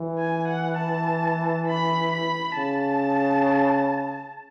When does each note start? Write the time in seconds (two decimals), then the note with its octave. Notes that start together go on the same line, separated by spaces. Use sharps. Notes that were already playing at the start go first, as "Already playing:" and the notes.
Already playing: E3
0.19 G#5
0.48 F#5
0.78 A5
1.68 B5
2.13 B5
2.57 C#3 A5